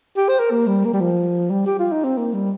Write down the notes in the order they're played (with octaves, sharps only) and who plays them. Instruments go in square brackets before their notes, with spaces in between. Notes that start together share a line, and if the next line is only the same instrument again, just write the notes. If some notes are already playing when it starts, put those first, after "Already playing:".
[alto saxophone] G4
C5
A#4
A#3
G3
A#3
G3
F3
G3
G4
F4
D#4
C4
A#3
G3